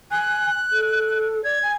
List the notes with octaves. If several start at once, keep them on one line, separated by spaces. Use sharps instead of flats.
G#5 F#6
A4
D5 G#6
G#5